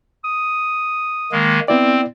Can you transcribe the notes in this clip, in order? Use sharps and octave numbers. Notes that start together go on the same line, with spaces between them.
D#6
D#3 G#3 A#3
B3 C4 E4 D5